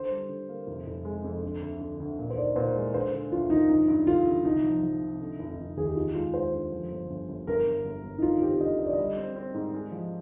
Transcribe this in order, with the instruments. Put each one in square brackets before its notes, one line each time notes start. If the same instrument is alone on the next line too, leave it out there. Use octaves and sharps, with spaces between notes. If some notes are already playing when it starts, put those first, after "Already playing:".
Already playing: [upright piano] D3 [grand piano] C5
[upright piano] G3
D3
A#3
F1
F1
G#3
F2
D3
D2
D3
D2
A#2
[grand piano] C5
[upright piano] D#4 [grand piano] D5
[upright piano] A#2 [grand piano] C5
[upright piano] G#3
[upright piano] D3 [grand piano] C5
[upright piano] D3
[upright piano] D2 [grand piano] F4
[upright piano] A#3 [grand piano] D#4
[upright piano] G2 [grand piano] D#4
[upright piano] G2
[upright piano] D3 [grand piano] F4
[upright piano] G2
[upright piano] C2 [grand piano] D#4
[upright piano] F3
F3
C3
D3
F1
F1
[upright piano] D#2 [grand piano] G#4
[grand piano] G4
[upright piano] D#4 [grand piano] F4
[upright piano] G#3 [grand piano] F4
[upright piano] G#3 [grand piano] C5
[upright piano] D3
F3
G1
G1
G1
[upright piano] G1 [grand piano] A#4
[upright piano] G1
G1
G1
[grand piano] D#4
[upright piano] D3 [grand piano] F4
[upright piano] C4 [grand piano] G4
[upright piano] D3 [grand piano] D#5
[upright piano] D3 [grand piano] D#5
[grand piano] D5
[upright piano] G3 [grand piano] D#5
[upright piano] C4
C4
G#2
G#3
F3